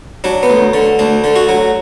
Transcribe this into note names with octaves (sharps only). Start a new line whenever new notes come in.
F#3 D4
B3
D2
D3
D2 D4
D3
F#4
F#3